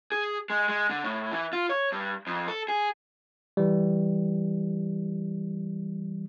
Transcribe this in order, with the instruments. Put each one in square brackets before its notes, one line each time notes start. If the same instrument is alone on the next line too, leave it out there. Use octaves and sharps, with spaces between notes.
[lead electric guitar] G#4
G#3
G#3
D3
A2
E3
F4
C#5
G2
F2
A4
G#4
[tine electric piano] E3 G3